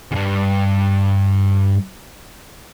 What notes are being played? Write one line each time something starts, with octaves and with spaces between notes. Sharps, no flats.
E2 G2